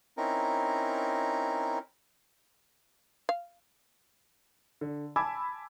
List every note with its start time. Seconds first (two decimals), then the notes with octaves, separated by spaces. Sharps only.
0.17 C4 C#4 D#4 E4 A#4
3.29 F5
4.81 D3
5.16 G#5 A5 B5 D6 E6 G#6